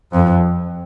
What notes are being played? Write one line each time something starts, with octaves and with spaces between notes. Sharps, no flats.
F2